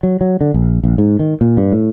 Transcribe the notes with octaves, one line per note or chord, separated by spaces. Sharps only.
F#3
F#3
D3
A#1
A#1
G#2
D#3
A#2
G2
A2